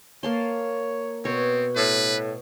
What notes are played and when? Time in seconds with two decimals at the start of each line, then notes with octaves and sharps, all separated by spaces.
0.23 A#3 C#5 A5 C6
1.25 B2 C4 C#5
1.76 A2 B4